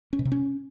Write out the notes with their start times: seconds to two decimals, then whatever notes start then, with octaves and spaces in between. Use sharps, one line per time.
0.13 C#4
0.19 B2
0.25 C3
0.32 C#4